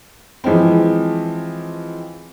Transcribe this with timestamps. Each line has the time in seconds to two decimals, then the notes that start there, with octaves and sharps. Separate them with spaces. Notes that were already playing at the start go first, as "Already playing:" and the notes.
0.44 E3 F3 G#3 C4